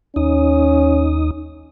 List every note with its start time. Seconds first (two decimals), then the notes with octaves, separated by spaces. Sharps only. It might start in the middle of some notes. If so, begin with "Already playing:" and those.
0.16 D#2 C#4 D#4 D#6